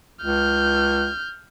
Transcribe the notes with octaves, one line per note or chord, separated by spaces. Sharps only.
C#2 F6 G6